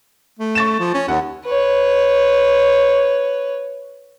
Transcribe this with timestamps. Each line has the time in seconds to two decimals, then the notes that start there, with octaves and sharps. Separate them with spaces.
0.39 A3
0.55 C#6 A6 E7
0.79 F3
0.94 C#4
1.08 D#2 F#5
1.45 B4 C#5